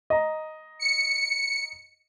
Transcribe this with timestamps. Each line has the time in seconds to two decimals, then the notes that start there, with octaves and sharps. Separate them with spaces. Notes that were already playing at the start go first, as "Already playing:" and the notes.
0.10 D#5 A#5
0.79 C#7